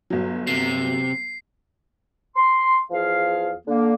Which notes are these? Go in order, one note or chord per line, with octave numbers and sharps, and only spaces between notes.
G1 F#3
C3 C7
C6
E2 F3 G#4 F5
D3 A#3